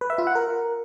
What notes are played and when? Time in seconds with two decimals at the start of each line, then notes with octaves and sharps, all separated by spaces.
0.01 B4
0.10 E5
0.18 F4
0.27 F#5
0.35 A#4